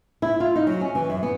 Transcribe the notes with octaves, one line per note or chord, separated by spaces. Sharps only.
E4
F4
D#4
F#3
C#4
E3
F#2
B3